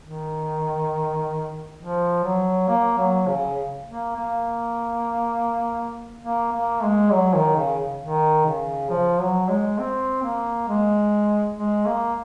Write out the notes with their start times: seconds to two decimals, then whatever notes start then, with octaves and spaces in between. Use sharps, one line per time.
0.02 D#3
1.79 F3
2.24 F#3
2.68 A#3
2.97 F#3
3.28 C#3
3.87 A#3
4.16 A#3
6.23 A#3
6.53 A#3
6.83 G#3
7.13 F#3
7.35 D#3
7.56 C#3
8.02 D#3
8.46 C#3
8.90 F3
9.20 F#3
9.49 G#3
9.79 C4
10.23 A#3
10.68 G#3
11.56 G#3
11.86 A#3